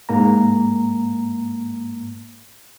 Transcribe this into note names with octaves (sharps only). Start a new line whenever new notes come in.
G#2 A#3 A#5